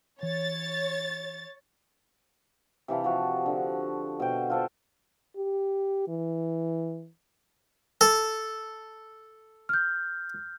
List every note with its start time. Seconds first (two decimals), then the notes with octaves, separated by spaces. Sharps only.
0.23 E3 C#5 A6
2.88 C3 E3 F5 A5
3.04 F3 F#4
3.46 D3
4.20 B2 C5 G5
4.50 F4 A4 C5
5.37 G4
6.08 E3
8.01 A4
9.69 F6 G6